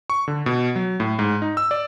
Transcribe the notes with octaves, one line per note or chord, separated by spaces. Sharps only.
C#6
D3
B2
F#3
A2
G#2
D#4
E6
D5